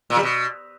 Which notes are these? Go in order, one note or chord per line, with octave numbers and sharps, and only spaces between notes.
A#2
G3
B2